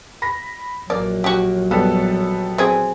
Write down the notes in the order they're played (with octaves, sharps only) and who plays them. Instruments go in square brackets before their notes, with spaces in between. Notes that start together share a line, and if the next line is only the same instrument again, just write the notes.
[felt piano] B5 A#6
[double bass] A#1 F#3 [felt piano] A#3 [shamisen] D5
[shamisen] F#4 G4
[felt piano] G3 B3 A4
[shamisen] C4 G#4